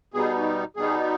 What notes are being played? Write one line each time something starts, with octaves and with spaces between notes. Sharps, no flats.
B2 G3 B3 D#4 G#4
B2 G3 B3 D#4 G#4